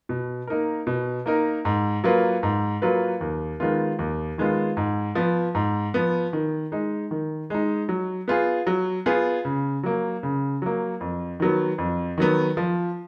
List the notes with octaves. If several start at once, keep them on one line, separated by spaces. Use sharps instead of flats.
B2
A#3 D#4 A#4
B2
A#3 D#4 A#4
G#2
F#3 A#3 F4 B4
G#2
F#3 A#3 F4 B4
D#2
D#3 G#3 B3 F4
D#2
D#3 G#3 B3 F4
G#2
F3 B3
G#2
F3 B3
D#3
G#3 D#4
D#3
G#3 D#4
F#3
B3 F4 G#4
F#3
B3 F4 G#4
C#3
F#3 A#3
C#3
F#3 A#3
F2
D#3 F#3 B3
F2
D#3 F#3 B3
F3